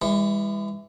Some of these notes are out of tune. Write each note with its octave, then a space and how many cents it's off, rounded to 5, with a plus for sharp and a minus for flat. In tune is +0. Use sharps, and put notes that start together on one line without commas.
E3 +0 G#3 -45